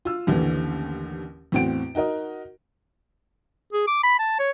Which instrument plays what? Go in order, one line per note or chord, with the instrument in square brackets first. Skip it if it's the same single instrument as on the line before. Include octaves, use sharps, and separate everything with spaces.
[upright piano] F4 E6
A1 D#2 D3 E3
E2 A2 C4 F#4 D7
D#4 F#4 A#4 D#5
[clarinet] G#4
D6
B5
A5
C#5